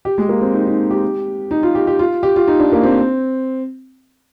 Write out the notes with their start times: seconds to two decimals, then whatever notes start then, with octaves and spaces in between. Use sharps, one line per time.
0.05 G4
0.18 G#3
0.29 A#3
0.41 C4
0.54 D#4
0.66 D#4
0.91 G4
1.51 D#4
1.63 F4
1.75 G4
1.87 G4
1.99 F4
2.23 G4
2.36 F4
2.48 D#4
2.59 D4
2.72 A#3
2.83 C4